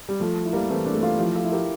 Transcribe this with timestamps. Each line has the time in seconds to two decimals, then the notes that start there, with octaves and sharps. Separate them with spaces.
0.09 G3
0.20 F3 A3
0.45 E4
0.53 G3 A#3
0.70 E3 A3 C4
0.86 A#3 D4
0.94 A3
1.03 F4 A4
1.19 F3 E4 G4
1.35 F4 A4
1.44 E4
1.52 G4 A#4